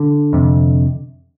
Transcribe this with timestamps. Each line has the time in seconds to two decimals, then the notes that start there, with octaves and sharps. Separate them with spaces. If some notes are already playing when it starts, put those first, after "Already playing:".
Already playing: D3
0.33 F2 C3